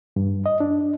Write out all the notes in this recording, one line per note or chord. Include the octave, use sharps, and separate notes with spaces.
G2
D#5
D4